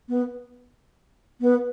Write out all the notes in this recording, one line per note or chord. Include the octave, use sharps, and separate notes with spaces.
B3
B3